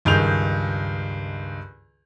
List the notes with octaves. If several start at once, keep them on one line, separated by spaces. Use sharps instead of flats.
C#2 G2 D#3 G#4 G6 F7